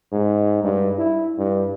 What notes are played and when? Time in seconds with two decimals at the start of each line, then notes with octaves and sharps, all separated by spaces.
0.12 G#2
0.64 G2
0.98 E4
1.38 G2